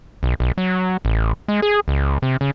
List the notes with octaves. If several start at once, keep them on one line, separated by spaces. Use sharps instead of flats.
B1
B1
F#3
A1
G#3
G#4
C#2
C3
C#3